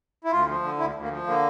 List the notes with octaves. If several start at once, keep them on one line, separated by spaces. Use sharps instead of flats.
E4
D2 F4
F3
D3
D2 E4
D2
A#3
F3
D3 A#3